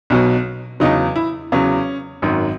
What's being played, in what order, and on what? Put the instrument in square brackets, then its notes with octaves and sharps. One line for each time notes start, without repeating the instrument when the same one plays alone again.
[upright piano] B1 B2 F#3
E2 C#3 F#3 D#4
E4
E2 C#3 F#3 C#4
G#1 F#2 D#3 F#3